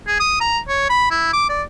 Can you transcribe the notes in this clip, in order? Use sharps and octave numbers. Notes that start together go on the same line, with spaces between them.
G#4
D#6
A#5
C#5
B5
E4
D6
D5